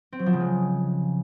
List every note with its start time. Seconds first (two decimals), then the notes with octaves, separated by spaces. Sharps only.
0.12 C4
0.19 F#3
0.26 F3
0.33 C#3
0.40 G#3